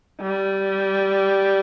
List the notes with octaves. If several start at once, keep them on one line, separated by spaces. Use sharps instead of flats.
G3